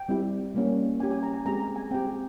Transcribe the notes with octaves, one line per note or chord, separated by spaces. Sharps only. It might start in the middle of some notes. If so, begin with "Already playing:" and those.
Already playing: G5
G3 C4 E4 G4
G3 A#3 C#4 G4
G3 C#4 G4 G#5
G#5
A#5
G#5
G#3 C4 G4 A#5
A#5
G#5
C4 G4 G5
G#4